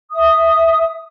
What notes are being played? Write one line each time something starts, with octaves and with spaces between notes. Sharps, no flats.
E5 D#6